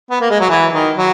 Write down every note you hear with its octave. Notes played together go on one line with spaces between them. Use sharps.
B3
A#3
G#3
F#3
E3
D#3
F#3